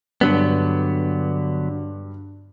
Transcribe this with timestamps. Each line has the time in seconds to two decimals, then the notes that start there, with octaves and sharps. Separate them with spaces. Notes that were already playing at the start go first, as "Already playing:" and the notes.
0.21 G2 D3 F#3 B3